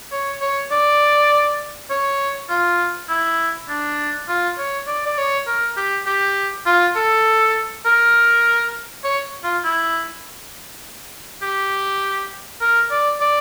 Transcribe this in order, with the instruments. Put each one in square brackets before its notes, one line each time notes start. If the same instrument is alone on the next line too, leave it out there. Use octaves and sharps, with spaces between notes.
[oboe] C#5
C#5
D5
C#5
F4
E4
D4
F4
C#5
D5
D5
C#5
A#4
G4
G4
F4
A4
A#4
C#5
F4
E4
G4
A#4
D5
D5